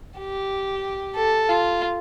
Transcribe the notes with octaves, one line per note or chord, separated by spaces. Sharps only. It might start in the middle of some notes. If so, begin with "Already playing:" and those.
G4
A4
F4